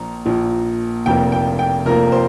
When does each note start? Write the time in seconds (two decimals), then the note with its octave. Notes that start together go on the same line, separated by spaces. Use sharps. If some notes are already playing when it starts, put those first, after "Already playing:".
Already playing: A#1 A#2 F3 A#5
0.25 A#1 A#2 F3
1.06 F1 F2 F3 A#3 G5
1.32 G5
1.59 G5
1.85 F1 F2 F3 A#3 A#4
2.12 C5